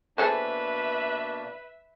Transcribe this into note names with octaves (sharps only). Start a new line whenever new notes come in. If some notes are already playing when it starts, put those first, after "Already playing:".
B2 A#3 D4 G#4 A4 B4 C5 E5